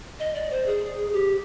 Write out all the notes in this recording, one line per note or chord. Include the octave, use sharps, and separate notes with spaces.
D#5
D5
C5
G#4
G4